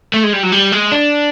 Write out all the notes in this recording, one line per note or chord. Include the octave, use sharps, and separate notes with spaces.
A3
G#3
G3
F#3
G3
G#3
D4